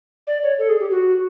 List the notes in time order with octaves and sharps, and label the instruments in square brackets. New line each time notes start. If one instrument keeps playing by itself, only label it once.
[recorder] D5
C#5
A4
G#4
G4
F#4